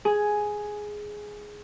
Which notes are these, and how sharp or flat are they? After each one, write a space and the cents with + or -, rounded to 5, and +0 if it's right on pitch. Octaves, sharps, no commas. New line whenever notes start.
G#4 +5